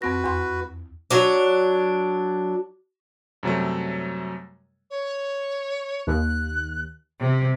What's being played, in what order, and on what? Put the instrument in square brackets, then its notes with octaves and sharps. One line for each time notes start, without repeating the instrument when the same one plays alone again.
[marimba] F2 C4 A#6 [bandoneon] F#4 B4
[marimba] E2 F#5 C6
[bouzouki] F#3 D4
[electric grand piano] F#2 C3 F#3 G3 A3
[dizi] C#5
[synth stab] D#2 [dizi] F#6
[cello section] C3